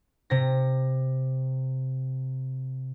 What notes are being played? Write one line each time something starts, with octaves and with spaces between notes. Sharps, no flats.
C3 A#6